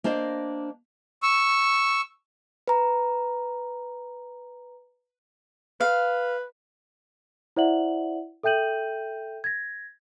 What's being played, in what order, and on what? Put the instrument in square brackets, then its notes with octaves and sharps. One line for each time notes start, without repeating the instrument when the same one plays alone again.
[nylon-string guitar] A#3 D4 C5 D#5 F5
[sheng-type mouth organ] C#6 E6
[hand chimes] B4 A#5
[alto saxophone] B4 [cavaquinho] F5
[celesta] E4 C5 D5 E5 F#5 F#7
A4 E5 G5 G6 D#7 F#7
G#6 A#6